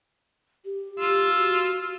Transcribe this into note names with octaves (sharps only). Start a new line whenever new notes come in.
G4
F4 E6
F#4